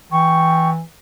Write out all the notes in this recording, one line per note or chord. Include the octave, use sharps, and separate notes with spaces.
E3 G5 C#6